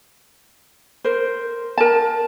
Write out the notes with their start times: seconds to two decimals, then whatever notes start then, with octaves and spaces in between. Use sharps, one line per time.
1.04 A#4 C5
1.78 A#4 A5